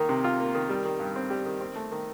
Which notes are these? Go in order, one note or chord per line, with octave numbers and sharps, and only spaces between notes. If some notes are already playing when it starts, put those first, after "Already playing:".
Already playing: D#3 A#3
C3
F4
A#3
D#3
G3
D#3
G2
C4
G3
D#3
C4
A3
D#3